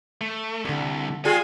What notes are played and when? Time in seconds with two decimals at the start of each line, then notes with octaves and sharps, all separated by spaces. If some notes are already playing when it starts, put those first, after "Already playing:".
0.21 A3
0.65 C2 D3 G3
1.25 G3 F4 G#4 G#5